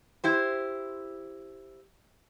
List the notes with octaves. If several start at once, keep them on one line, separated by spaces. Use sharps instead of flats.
E4 G4 C5